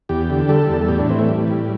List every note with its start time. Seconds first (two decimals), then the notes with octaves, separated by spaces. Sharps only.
0.09 E2 G4
0.30 D3
0.49 G3 A4
0.69 E2
0.81 A4
0.88 A2 G4
0.99 D4
1.09 E3 C4
1.19 A3
1.29 G3
1.48 A2